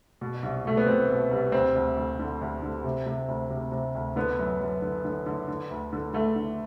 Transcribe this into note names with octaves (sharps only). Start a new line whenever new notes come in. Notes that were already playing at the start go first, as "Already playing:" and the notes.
B2
C2
B2 A3
B3
B2 C4
B2
C2
D2 C4
D2
D2
D3
D2
D3
C3
C3
D2
C3
C3
D2
D3 B3
F#2
F#2
D3
D3
D3
D3
D2
D3
D3 A3
D3